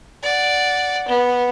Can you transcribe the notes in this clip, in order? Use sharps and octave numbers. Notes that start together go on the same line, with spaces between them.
D5 F#5
B3